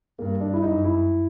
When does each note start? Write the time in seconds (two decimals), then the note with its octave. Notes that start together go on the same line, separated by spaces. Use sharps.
0.19 G2 A#3
0.41 D4
0.53 E4
0.62 F#2 D#4
0.84 E4